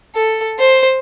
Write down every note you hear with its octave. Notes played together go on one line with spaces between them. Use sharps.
A4
C5